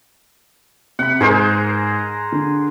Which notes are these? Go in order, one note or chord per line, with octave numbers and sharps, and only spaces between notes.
C3 F#5 B5
G#2 G#4 A#4 C5
D3